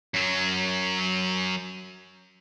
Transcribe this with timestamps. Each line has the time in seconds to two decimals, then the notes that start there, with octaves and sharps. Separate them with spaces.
0.14 F#2 F#3